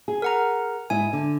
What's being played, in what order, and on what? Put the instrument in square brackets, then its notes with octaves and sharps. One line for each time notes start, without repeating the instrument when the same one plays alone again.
[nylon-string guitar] G#4
[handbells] A#4 F#5 A#5
[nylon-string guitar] G#2 E4 [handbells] G#5
[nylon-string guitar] D3